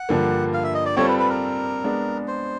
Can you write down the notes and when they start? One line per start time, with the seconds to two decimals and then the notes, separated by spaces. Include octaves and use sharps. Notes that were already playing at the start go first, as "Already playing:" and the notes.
Already playing: F#5
0.09 G2 D3 F3 A#3
0.54 F5
0.64 E5
0.74 D#5
0.86 D5
0.97 G3 C4 F4 A4 C5 C#5
1.08 B4
1.19 B4
1.29 A#4
1.84 G#3 B3 D4
2.28 C5